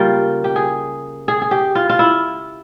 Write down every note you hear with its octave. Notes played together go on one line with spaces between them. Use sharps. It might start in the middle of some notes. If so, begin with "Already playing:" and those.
Already playing: C#3 G3 A#3 F4 G4
G4
G#4
G#4
G#4
G4
F4
F4
E4